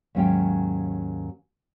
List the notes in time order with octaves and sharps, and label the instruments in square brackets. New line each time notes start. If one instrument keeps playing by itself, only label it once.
[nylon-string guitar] D#2 G#2 F#3 C#4 F5 G5